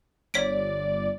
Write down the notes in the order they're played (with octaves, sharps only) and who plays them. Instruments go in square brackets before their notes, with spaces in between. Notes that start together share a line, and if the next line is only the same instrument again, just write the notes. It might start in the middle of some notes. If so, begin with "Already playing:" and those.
[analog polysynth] G1 D5 [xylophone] C#5 B6 D7